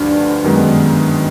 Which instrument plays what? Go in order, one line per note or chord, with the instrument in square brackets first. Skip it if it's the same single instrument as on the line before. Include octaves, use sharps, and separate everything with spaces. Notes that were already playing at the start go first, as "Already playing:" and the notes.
Already playing: [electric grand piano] D2 D3 F3 [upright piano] G2
[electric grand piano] F#2 D#3 G#3 B3